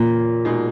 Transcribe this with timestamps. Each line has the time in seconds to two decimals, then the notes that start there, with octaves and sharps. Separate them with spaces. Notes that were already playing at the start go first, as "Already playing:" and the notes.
Already playing: E2 A#2 C#3 C#4
0.45 B2 G#3 D#4 G#4